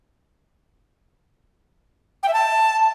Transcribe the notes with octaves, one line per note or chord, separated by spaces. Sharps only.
G5
E5
A5